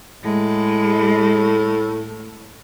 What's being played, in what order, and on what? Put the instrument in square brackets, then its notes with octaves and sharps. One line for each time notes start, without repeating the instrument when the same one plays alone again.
[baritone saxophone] A2 [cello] G#3